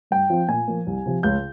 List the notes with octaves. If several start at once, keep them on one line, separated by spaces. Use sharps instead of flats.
G2 G5
F3 C4 F4
A#2 G#5
F3 A#3
C2
C3 F3
C#2 G6